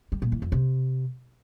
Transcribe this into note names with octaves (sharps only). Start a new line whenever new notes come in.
G3
A#2
E3
F2
C3